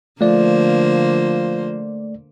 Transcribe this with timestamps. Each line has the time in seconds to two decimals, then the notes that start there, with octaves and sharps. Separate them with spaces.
0.21 D3 F3 A3 A#3 C5 D5